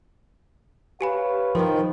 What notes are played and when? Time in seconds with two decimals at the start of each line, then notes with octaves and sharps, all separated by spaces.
1.01 G4 B4 C#5 F5 G#5 B5
1.55 D#3 F3 D#5 C6